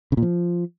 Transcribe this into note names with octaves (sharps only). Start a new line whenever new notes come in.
C#3
A#2
F3